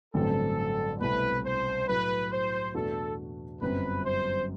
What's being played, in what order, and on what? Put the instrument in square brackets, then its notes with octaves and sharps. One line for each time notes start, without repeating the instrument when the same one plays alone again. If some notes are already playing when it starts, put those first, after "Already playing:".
[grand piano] A1 G2 D3 F#3 C4 [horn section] A4
[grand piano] C2 B2 A3 C4 E4 [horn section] B4
[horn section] C5
[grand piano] A2 F#3 A3 E4 [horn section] B4
[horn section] C5
[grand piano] E2 B2 A3 D4 F#4 [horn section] A4
[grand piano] G1 F#2 F#3 C4 [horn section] B4
[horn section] C5